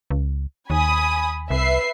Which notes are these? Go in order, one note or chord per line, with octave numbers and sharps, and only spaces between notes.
C#2
D#2 G#5 B5 D#6
C2 B4 E5 C7